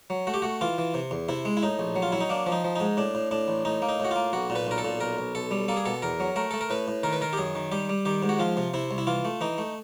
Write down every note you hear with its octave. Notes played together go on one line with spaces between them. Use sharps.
F#3
A3 F#4
G4
A3 F#4
E3 F4
E3
C3
E2
C3 E4
G#3
E4
A2 D#4
A#1
F#3
F4
F#3 E4
D#4
A#3 D4
F3
D#4
F3
G#2 D#4
A2 D4
A2
A2 D4
A1
A2 D#4
A#3
D#4
A2 F#4
A#3 F4
B1 F#4
A#2
B4
B1 A#4
A4
A#2
B1 A#4
B1
B1 A4
G3
A#3 A4
G#4
B2 A4
E2 A#4
F#3
A3 A#4
A3 A4
A#4
A2 B4
A2
D#3 A#4
B4
D#3 A#4
G4
F#2 G#4
D#3
G3 G4
G3
D#3 G4
G#2
F#4
F3 F4
C3
C3 E4
C2
E4
E3 F4
A3
E3 D#4
A3